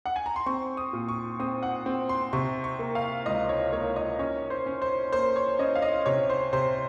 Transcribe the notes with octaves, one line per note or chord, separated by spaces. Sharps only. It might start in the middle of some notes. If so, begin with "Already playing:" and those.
F#5
G#5
A#5
C6
C4 C#6
D#6
A#2
C#6
C4 D#6
F#5
C4
C6
C3 C#6
C#6
A#3
F5
C#2 D#5
C#5
A#3 C#5
D#5
C#4 C#5
C5
C#4
C5
A#3 C5
C#5
C#4 D#5
F5
D#5
C3 C#5
C5
C3 C5